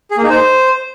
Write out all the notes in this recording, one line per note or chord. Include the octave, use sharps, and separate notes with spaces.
G#4
A#3
D#4
C5